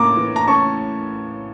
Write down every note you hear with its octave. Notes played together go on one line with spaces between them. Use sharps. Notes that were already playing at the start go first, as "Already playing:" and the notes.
Already playing: A2 A#3 C#4 A#5 D6
E3
A#5
C#4 A5 C#6